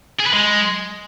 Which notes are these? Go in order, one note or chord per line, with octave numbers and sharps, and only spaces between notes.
G#4
B4
G#3